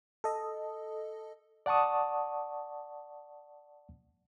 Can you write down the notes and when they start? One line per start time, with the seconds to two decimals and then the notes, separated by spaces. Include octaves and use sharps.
0.24 A4 D#5
1.66 D5 F#5 A5 C#6 D#6